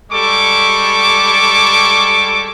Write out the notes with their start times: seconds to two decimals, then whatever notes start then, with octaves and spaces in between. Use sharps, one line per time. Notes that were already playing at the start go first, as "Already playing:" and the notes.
0.12 G3 G#3 A4 C#6 D6